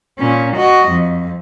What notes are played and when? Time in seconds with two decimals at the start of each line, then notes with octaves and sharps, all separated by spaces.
0.18 A#2 C#4
0.56 F#4 D#5
0.89 F2